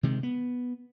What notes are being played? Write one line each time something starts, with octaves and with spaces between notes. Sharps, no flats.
C3 D#3 G#3
B3